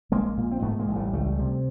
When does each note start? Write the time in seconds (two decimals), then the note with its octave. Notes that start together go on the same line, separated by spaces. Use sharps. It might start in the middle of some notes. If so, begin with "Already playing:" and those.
0.12 A#1 G#3 A#3
0.37 A#2
0.51 C4
0.62 G#2 A3 B3
0.79 G#3 A#3
0.88 A1
0.96 G3 A3
1.13 C#2 G3 A3
1.39 C3